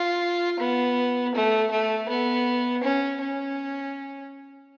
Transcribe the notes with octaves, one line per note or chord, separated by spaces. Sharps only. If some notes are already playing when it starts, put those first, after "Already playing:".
Already playing: F4
B3
A3
A3
B3
C#4
C#4